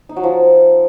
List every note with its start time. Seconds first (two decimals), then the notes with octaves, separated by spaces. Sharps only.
0.09 D#4
0.16 F#3
0.24 F3